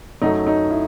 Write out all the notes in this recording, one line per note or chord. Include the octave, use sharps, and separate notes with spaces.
F#2 F#3 A3 D#4
D#4
E4